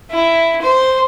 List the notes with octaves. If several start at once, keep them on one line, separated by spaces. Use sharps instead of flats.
E4
C5